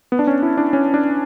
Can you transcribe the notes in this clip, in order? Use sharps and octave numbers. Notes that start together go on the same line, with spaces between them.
B3
D4
C#4
E4
D4
C#4
D4